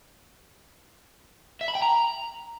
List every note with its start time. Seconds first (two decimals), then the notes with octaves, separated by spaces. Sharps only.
1.61 E5
1.68 B5
1.75 G5
1.82 A#5